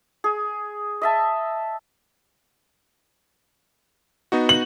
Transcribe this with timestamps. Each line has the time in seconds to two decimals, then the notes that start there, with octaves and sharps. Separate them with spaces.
0.24 G#4
1.02 D#5 E5 A5
4.32 B3 D#4 F#4
4.49 F#7